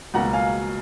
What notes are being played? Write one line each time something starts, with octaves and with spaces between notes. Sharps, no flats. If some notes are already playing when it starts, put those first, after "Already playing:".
C#2 B2 F#3 A#3 F#5 A#5
F5 G#5